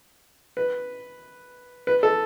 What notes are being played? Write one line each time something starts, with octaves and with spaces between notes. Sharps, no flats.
B4
B4
A4